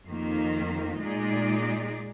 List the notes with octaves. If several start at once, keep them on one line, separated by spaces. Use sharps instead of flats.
F2 D#3 A#3
A#2 G#3 D#4 G#4 D5